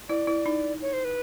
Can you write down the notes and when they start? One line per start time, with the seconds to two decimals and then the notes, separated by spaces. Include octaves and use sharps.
0.09 E4 D5
0.27 E4
0.46 D#4
0.82 C#5
0.93 C5
1.04 B4